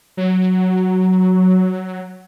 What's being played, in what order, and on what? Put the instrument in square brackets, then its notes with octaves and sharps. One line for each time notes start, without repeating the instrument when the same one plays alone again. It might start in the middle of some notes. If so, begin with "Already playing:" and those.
[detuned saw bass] F#3